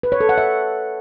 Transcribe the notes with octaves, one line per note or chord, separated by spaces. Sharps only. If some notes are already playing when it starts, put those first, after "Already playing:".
B4
C#5
A4
F#5
E5